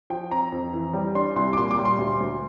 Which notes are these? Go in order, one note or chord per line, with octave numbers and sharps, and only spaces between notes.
F3 G5
C4 A#5
F2
E3
G3
D4 C6
C2 C6
D6
A#2 C6
D6
G3
C6
D2
D2